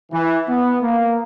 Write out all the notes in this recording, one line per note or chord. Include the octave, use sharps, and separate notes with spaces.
E3
B3
A#3